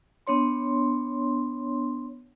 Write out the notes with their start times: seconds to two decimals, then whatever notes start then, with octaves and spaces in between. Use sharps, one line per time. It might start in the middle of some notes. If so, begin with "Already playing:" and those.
0.27 B3 D4 C#5 C6